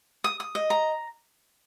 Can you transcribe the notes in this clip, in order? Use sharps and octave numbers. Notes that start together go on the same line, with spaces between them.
D#6
D#6
D#5
A#5